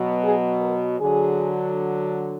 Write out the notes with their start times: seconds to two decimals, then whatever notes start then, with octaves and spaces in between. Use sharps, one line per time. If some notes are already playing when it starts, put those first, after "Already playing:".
Already playing: B2 F#3
0.23 G#4
0.61 A#4
1.00 D3 F#3 G#4